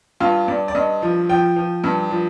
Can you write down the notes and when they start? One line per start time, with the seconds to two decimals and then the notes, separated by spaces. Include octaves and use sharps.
0.20 G2 F4
0.48 G2 D5
0.68 D5
0.75 G2 D#5
1.02 F3
1.29 F3 G5
1.56 F3
1.84 G2
2.11 F3